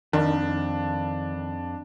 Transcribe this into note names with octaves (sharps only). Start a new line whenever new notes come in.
F2 D#3 D4